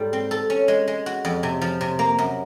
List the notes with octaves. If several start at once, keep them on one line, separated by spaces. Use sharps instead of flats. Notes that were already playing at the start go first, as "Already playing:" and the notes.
Already playing: G#2 G3 A4
C4
A4
C#4
G#3
G#3
F#4
F2
C3
F3
C3
A#3
F#2